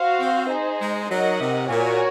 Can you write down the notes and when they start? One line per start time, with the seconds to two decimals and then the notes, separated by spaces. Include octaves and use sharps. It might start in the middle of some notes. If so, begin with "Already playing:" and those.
Already playing: F#4 C5 F5
0.19 C4
0.49 D#4 G#4 C5
0.80 G#3
1.09 F#3 D#4 A#4 D#5 F#5
1.39 C3
1.69 A#2 F#4 A#4 C#5 G#5